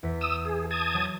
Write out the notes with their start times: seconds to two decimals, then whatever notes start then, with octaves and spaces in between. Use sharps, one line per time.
0.03 E2 B6
0.21 D#6 E6
0.45 G#4
0.71 A5 D#6 G#6
0.94 F#3